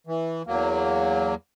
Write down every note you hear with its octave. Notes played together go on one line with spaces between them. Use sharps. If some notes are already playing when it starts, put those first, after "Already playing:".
E3
E2 F#3 A#3